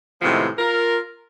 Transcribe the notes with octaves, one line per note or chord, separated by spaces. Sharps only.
A2 C3 D#3 F3 G#3 B3
F4 A#4